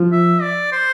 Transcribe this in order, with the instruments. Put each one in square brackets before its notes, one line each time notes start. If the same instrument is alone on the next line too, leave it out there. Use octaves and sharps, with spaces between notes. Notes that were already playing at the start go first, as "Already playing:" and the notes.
Already playing: [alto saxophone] F3
[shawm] E5
D5
C5